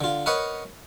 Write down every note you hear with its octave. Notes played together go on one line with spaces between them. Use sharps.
D3 F4
A#4 B4 C#5 D#5 F#5